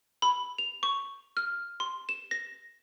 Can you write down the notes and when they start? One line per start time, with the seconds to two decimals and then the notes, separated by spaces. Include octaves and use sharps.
0.22 B5
0.58 F7
0.83 C#6
1.37 F6
1.80 C6
2.09 E7
2.31 A#6